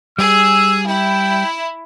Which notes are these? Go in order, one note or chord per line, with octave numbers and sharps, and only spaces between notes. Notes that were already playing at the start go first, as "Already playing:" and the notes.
G3 G#4 E6
E4 G5